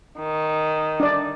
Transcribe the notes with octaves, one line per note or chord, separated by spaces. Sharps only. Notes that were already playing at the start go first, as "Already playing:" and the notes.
D#3
D4 D5